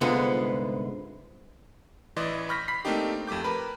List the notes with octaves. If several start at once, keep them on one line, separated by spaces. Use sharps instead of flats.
C2 G#2 D3 G#3 B3 F4
A1 E3 E4 D5 D#5 C6
B5 C#6 F6 G6 A#6 B6
B5 B6 C7
A3 A#3 C4 D4 D#4 G4
F2 A3 G4 D6 G6
A#4 B4 B5